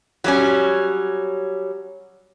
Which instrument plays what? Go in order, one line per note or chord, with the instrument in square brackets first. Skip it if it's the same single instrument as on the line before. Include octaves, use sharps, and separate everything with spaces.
[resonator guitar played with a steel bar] F#3 G3 C#4